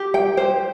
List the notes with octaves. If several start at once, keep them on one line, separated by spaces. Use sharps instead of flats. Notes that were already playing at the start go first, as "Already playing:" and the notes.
Already playing: G4
G5
C5